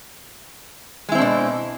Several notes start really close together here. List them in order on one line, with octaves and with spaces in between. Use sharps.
G#3 E4 C4 D4 B2